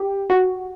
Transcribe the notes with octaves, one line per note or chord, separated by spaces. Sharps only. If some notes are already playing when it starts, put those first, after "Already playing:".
Already playing: G4
F#4